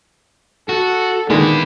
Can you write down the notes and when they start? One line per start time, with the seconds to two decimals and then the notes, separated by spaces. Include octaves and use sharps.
0.69 F#4 A4
1.30 A#2 D3 D#3 G#3 B3 E4